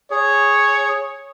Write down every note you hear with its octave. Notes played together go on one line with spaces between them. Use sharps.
G#4 C#5